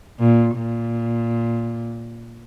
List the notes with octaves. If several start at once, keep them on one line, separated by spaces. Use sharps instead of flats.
A#2
A#2